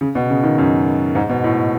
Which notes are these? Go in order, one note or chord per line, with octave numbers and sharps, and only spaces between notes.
C#3
B2
C#3
D#3
F#2
G#2
B2
A2